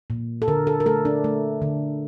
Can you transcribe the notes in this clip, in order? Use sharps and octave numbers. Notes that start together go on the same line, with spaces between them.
A#2
A4
D3 A#4
A4
A#4
A3 A4
D4
A3
D3